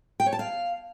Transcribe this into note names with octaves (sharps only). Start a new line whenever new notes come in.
G5
C#5
A5
F5